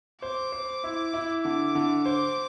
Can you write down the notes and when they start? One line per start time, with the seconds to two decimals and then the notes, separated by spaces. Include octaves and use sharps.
0.22 C5 D6
0.52 C5
0.84 E4
1.14 E4
1.44 D3 D6
1.75 D3
2.05 C5 D6